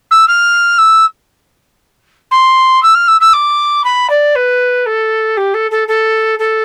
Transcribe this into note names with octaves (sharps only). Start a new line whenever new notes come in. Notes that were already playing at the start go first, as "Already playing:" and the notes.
E6
F6
E6
C6
E6
F6
E6
E6
D6
B5
D5
B4
A4
G4
A4
A4
A4
A4